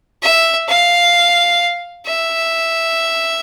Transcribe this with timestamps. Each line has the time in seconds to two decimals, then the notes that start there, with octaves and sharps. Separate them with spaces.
0.22 E5
0.69 F5
2.06 E5